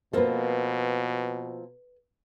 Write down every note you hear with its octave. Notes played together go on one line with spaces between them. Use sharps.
B2 F3 A#3 C4 A4 B4